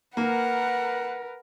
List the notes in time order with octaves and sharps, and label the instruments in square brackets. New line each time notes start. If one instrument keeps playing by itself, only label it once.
[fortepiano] A#3 [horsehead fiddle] A#4 B4 [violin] F#5